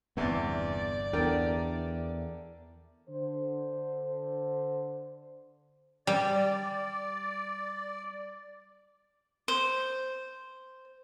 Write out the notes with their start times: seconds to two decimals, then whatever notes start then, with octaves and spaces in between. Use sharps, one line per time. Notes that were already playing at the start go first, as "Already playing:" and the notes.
0.17 G1 E2 C3 B3 D5
1.13 E2 D3 A#4 G5
3.08 D3 C5
6.07 G3 D5
9.48 C5